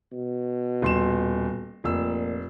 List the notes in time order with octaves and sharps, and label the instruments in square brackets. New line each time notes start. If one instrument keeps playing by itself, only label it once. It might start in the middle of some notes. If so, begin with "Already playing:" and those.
[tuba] B2
[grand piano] D#1 C6 E7
[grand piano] F1 E6 [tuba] A#2